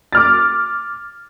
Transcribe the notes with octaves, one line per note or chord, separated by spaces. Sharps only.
D6 F6 A6